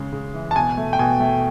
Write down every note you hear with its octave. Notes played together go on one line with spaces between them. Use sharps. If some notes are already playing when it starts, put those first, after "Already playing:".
Already playing: C#3 G#3
C#3
E3
A5
B2 G#5
A3
G5
B2 G#5
A3